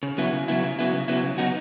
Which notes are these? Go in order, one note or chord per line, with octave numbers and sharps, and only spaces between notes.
C#3
F#3 B3 E4
C#3
F#3 B3 E4
C#3
F#3 B3 E4
C#3
F#3 B3 E4
C#3
F#3 B3 D#4 F#4